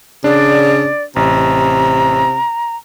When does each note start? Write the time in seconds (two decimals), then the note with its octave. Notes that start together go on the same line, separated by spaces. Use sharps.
0.24 C#3 D4 D5
1.16 A1 C3 A#5